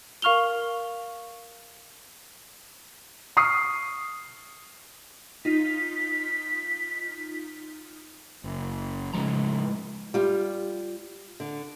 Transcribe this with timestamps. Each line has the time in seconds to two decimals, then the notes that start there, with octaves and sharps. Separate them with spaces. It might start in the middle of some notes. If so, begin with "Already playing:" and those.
0.22 A#4 F5 C#6 F6 F7 G7
3.37 C#6 D#6 F6 C7
5.45 D#4 F4 B6
8.44 F#1
9.14 A2 C#3 F3 G#3 A#5
10.14 G3 F4
11.40 D3